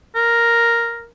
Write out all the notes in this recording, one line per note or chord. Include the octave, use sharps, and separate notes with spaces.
A#4